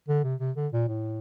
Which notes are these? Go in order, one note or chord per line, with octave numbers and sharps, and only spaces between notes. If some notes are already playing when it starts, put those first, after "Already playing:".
D3
C3
C3
D3
A#2
A2